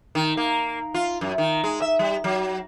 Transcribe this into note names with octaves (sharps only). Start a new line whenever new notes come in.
D#3
A#3
F4
F#2
D#3
G#3
E5
G3
F#3